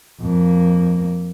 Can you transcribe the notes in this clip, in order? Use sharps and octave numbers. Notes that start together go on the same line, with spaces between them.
F2 A#3